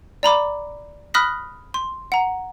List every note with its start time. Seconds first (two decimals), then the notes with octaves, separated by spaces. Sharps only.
0.23 D5 A#5 B5 D6
1.14 B5 D#6 F6 F#6 A#6 B6
1.74 C6
2.12 F#5 A#5